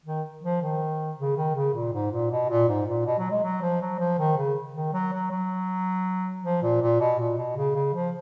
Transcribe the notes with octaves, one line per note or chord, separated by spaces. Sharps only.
D#3
F3
D#3
C#3
D#3
C#3
A#2
G#2
A#2
B2
A#2
G#2
A#2
B2
F#3
G#3
F#3
F3
F#3
F3
D#3
C#3
D#3
F#3
F#3
F#3
F3
A#2
A#2
B2
A#2
B2
C#3
C#3
F3